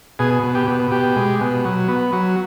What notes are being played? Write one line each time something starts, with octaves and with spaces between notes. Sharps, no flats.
B2 G#4
B2
G4
B2
B2 G4
G#3
B2
F#3
B3
F#3